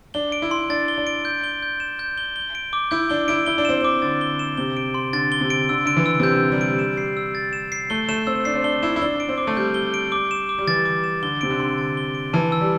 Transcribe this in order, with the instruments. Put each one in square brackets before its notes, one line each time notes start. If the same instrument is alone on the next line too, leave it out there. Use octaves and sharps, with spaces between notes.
[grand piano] D4 [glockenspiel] G7
[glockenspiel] D7
[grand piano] E4
[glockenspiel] C6
[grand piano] D4 [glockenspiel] A6
[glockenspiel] G7
[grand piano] D4
[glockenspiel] D7
G6
G7
G6
E7
G6
G7
G7
D7
D6
[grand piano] E4 [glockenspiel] G6
[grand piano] D4 [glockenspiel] G7
[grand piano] E4 [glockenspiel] D7
[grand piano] E4 [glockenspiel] G7
[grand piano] D4
[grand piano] C4 [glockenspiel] E7
[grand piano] D4 [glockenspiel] D6
[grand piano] D3 [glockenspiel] A6
[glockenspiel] G7
E7
[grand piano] C3 [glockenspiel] G7
[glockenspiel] D7
C6
[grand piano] D3 [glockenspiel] A6
[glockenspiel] G7
[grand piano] C3
[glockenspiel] D7
[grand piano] D3 [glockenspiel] E6
[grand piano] D3 [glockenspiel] D7
[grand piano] E3
[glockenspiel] E6
[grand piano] C3
[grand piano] D3 [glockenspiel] G6
[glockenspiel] E6
[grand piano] G3
[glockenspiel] D7
E7
C7
E6
A6
E7
C7
[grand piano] A3 [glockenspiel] G7
[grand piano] A3 [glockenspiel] E7
[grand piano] C4 [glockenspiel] E6
[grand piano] D4 [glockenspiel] C7
[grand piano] C4
[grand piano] D4 [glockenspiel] G7
[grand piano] E4 [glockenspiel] E7
[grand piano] E4
[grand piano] D4 [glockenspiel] G7
[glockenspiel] D7
[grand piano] C4
[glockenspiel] D6
[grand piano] A3
[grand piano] G3 [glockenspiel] G6
[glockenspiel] G7
D7
D6
E7
D6
[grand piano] G3
[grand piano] E3 [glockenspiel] A6
[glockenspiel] D6
E7
[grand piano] D3 [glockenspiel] G7
[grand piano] C3 [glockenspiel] D7
[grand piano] D3
[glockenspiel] C6
A6
G7
D7
[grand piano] E3 [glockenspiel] A5
[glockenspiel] E6
[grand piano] G3